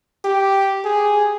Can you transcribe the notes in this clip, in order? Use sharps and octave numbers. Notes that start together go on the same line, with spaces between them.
G4
G#4